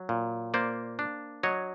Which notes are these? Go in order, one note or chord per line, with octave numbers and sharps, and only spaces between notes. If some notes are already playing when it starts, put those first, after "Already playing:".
Already playing: F#3
A#2
A#3 C5 D5
D4
F#3 C#5 D#5